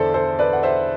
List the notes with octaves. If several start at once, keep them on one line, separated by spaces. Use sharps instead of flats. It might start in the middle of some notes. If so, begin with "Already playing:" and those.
Already playing: E2 D3 A4 C5 D5 E5
A4 C5
B4 D5
F#5
C5 E5